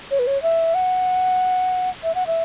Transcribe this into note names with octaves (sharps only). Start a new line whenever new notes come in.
C#5
B4
C#5
E5
F#5
E5
F#5
E5